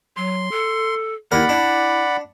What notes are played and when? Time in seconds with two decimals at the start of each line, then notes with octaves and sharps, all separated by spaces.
0.17 F#3 C6
0.51 A4
1.32 D#2 E4 A#4 D5 F#5 B5
1.49 D4 E4